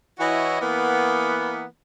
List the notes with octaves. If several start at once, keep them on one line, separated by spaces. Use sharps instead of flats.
E3 E4 F#4 C#5 D#5
E3 A#3 B3